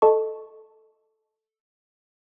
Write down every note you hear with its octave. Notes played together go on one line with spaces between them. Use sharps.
A4 D#5 A5 C#6